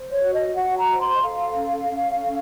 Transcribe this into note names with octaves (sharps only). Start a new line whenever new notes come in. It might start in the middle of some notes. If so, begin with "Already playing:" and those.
Already playing: C5
C#5
F#4
D#5
F#4 F#5
A#5
C5
C6
D#5
A4 F5
C#4
C#4
A4